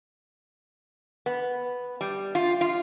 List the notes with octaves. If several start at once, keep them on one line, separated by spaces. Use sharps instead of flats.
B3
G3
F4
F4